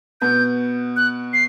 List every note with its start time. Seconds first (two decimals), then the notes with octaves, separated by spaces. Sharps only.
0.21 B2 B3 G6
0.96 F#6
1.33 C7